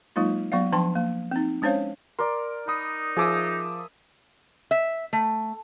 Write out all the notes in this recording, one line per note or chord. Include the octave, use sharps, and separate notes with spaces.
F#3 G#3 A#3 D#4 F4
F#3 B3 D5 F5
F3 D4 G5 A5 C6
A#3
C4 D#4
G#3 C#4 D4 C5 C#5 F5
A#4 D5 C6
D#4 B5 D#6
F3 G#4 E5 D6 D#6
E5
A3